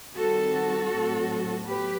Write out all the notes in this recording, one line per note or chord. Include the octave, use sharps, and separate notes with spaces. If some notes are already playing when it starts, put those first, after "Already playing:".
D#3 G3 C4 F#4 A4
A2 F#3 C4
F#3 B3 G4 B4